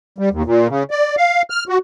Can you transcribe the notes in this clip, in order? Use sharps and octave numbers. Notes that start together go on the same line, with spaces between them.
G3
D#2
A#2
C#3
D5
F5
F6
F#4